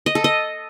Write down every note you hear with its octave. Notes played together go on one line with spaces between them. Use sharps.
D#5
A4
D#5